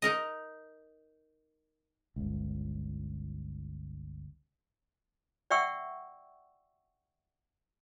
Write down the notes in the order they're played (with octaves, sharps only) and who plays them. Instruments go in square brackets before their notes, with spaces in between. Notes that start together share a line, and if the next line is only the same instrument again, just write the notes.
[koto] D#4 A#4 D#5
[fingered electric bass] G1 C#2
[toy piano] D5 E5 F#5 G5 C#6 E6